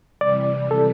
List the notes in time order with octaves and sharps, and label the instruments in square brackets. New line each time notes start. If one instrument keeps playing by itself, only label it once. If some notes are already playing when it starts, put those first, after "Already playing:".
[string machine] C3 E3 G3 [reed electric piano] D5
[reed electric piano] A4